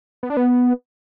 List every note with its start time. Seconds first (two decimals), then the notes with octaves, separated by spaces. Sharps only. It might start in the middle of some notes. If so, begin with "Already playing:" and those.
0.23 B3
0.30 D4
0.37 B3